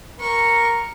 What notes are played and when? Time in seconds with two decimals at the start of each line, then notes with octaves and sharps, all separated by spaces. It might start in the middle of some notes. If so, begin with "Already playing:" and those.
0.20 A#4 C#6